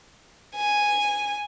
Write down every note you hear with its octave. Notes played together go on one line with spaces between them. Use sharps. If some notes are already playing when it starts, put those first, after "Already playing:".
G#5